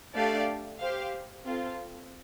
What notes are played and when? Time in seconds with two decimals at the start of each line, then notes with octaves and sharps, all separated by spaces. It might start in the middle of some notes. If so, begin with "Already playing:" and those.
0.14 A3 D4 G4 D5 F5
0.79 G4 C5 F5
1.45 C4 F4 A4